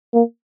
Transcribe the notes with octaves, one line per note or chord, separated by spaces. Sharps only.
A#3